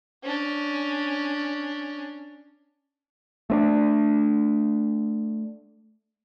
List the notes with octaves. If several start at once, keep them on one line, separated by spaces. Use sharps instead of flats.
C#4 D4
A3 C4 D4